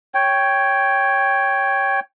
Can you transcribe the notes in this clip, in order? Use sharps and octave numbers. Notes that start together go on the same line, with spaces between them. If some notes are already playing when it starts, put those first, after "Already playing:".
C#5 G5